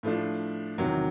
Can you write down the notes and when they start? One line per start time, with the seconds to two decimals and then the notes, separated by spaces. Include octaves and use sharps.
0.03 A2 F3 A3 D4
0.78 E2 C3 D#3 F#3